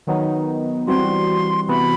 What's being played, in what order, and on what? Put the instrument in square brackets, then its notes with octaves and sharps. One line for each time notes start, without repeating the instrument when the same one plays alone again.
[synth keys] D#3 F#3 B3 D#4
[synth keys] E3 G3 C4 F#4 [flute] C6
[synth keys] C3 E3 B3 F#4 [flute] B5